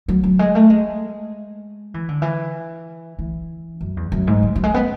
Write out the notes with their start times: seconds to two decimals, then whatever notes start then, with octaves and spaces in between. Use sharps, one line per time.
0.08 F#3
0.24 F#3
0.39 G#3
0.55 A3
0.70 G#3
1.94 E3
2.08 D3
2.22 E3
3.19 E3
3.81 F#2
3.97 E2
4.12 F#2
4.27 G#2
4.43 F#3
4.56 F#3
4.64 G#3
4.74 B3